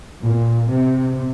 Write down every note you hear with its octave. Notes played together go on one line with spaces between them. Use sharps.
A#2
C3